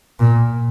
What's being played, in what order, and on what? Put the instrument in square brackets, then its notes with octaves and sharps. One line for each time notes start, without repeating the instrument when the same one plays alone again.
[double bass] A#2